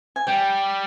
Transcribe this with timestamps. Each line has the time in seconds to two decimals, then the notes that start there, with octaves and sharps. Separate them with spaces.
0.16 G#5
0.27 G3 G5